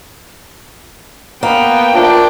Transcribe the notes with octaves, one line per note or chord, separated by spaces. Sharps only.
A#3 B3 G5 A#5 B5
F3 A3 D4 A#4